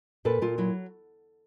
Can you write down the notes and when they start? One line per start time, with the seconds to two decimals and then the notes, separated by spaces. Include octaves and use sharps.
0.25 A#2 A4 B4
0.42 A#2 F4
0.58 F#3 E4